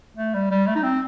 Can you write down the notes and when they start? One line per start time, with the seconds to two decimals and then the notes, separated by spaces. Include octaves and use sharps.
0.17 A3
0.34 G3
0.51 G3
0.67 A3
0.75 D#4
0.83 C4